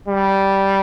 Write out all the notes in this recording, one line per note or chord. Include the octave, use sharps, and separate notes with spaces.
G3